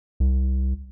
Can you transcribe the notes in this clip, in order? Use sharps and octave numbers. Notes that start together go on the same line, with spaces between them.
C2